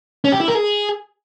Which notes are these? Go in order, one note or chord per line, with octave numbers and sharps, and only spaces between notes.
C#4
G4
E4
A#4
G#4